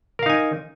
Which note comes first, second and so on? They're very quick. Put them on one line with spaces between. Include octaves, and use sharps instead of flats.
A#4 F5 D#4 G#5